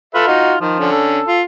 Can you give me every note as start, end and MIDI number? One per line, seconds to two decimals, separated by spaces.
0.15 0.58 65
0.15 0.27 69
0.15 0.27 71
0.15 0.27 76
0.28 0.54 63
0.28 0.54 66
0.61 0.75 51
0.61 0.92 53
0.79 1.20 50
0.79 1.20 61
0.92 1.39 69
1.28 1.42 65